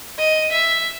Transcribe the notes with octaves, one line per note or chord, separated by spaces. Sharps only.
D#5
E5